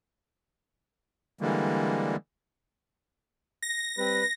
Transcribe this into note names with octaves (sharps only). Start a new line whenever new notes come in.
D3 E3 G3 G#3 A#3
A#6
G3 C4 B4